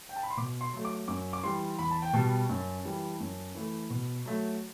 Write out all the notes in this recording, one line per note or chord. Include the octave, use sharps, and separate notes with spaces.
G5
A5
B5
C6
B2 D6
C6
F#3 A3
D6
F#2 D6
D6
E3 G3 C6
E2 B5
A5
G5
B2 G3 A5
F#2
E3 G3
F#2
E3 A3
B2
F#3 A3